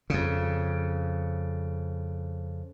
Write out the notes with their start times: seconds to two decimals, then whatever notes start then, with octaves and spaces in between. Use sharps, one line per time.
0.10 F2 C#3